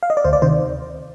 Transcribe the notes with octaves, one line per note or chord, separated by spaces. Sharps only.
F5
D#5
D5
D2 C5
D5
C3 D#3 C5